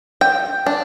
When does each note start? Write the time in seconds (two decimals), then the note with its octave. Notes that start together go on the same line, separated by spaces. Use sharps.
0.21 G5
0.66 D4